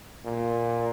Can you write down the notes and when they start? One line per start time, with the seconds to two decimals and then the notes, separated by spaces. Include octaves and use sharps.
0.25 A#2